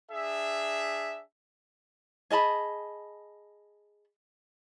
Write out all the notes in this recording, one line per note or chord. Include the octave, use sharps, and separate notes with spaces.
D4 G#4 E5
G#4 D#5 A5 B5